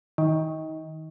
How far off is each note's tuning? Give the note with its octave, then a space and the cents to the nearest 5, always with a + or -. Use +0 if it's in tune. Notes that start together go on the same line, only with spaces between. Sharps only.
D#3 +25